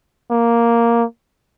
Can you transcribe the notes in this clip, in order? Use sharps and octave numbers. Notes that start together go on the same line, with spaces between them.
A#3